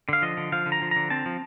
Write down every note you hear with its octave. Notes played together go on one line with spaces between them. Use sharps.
D3 F5
F3 D#5
D3
F3 F5
D3
A#5
F3
D3 A#5
C4 A5
F3